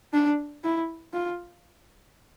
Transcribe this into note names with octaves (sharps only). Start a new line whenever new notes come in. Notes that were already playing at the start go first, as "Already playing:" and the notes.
D4
E4
F4